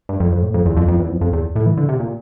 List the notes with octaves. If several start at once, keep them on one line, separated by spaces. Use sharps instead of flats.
G2
F2
F2
A2
F2
E2
F2
F2
E2
F2
F2
E2
A2
E3
D3
C3
A#2